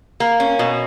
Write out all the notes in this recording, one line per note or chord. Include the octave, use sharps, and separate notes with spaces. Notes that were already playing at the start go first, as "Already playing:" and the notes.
A#3
C#4
B2